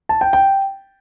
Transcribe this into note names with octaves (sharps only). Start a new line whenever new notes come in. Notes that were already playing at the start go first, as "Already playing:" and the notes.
A5
G5
G5